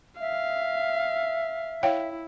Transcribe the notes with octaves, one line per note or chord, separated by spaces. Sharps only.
E5 F5
E4 C#5 F5 G5